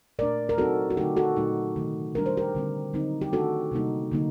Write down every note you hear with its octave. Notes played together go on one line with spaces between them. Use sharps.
A#2 A3 D4 A#4 D5
A#4
F#3 C4 D#4 F#4 A4
F#4
D3 A3 D#4 G4
F#4 A4
A#2 F#3 A3 D#4
C3 D#3 A3
D#3 G3 D4 A#4
C5
G4 A#4
D3 G3 C4
D3 F#3 C4 D#4
G4
D#3 A3 D4 F#4 A4
C3 G3 A#3 D#4
D3 F#3 A#3 D#4